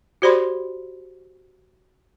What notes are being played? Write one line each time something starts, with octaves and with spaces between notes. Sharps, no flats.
F#4 G4 C5 D5 B5 C6